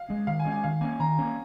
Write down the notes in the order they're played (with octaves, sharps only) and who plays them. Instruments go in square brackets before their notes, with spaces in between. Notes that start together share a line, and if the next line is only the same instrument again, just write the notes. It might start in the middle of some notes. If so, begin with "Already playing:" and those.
Already playing: [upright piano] F5
[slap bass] G#3 C#4
[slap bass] D#3 [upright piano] F5
[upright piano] G#5
[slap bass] G#3 C#4
[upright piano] G#5
[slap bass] D#3 [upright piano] F5
[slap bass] A#3 C#4 [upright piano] G#5
[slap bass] D#3 [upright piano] A#5
[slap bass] A#3 C#4